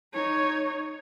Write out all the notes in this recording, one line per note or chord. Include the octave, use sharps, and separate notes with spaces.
D#4 C#5